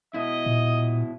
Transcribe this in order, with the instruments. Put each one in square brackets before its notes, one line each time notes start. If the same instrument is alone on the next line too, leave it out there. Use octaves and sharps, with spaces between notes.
[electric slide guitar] B2 E4 [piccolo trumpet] D#5
[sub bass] A#2